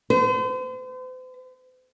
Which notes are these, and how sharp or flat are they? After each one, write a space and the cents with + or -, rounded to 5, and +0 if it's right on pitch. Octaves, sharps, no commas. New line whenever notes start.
C5 -45